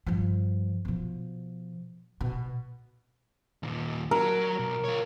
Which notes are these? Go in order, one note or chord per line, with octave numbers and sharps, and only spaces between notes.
G2 F3
B2 F3
B2
D#2 A#2
F#3 A#4
B1 B2
F4 C#5